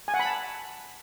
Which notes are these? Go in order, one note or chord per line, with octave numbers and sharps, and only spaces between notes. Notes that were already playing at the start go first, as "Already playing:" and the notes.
G#5
F#5
B5
A5